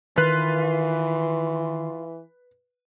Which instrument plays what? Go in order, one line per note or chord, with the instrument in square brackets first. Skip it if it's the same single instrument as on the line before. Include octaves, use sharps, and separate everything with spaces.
[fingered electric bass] D#3 [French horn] E3 [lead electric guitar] F4 [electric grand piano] B4 F#6